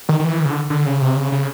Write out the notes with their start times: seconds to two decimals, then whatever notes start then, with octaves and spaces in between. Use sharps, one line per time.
0.09 D#3
0.19 D#3
0.24 E3
0.40 D#3
0.45 C#3
0.50 D3
0.70 D3
0.86 C#3
1.01 C3
1.17 C#3
1.32 C#3